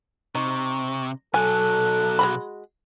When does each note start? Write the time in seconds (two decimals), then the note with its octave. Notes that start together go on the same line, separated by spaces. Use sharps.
0.35 C3 D#4 C#6
1.34 B1 F#3 A4 G#5 F#6
2.19 G#3 F#4 B5